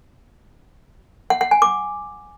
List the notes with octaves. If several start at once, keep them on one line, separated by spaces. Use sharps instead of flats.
F#5
F#5
G#5
D6